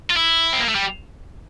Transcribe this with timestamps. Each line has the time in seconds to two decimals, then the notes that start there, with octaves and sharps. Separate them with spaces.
0.10 F4
0.16 E4
0.53 C4
0.60 A#3
0.69 A3
0.75 G3